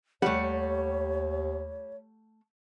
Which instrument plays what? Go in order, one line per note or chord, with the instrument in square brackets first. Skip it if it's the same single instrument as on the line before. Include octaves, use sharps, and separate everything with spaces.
[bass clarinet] D#2 [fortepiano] G3 [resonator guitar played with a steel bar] A3 F#5 [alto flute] C#5